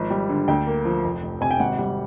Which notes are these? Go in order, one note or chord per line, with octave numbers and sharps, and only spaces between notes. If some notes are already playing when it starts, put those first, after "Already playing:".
Already playing: G#1 F3
G3
D3
D2 G5
A#3
F3
F1
F1
C3 G#5
G5
G#1 F#5
G3